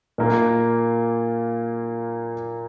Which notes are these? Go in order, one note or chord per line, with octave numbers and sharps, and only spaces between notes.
A#2 A#3 F4